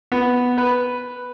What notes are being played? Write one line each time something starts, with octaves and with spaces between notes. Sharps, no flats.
B3
B4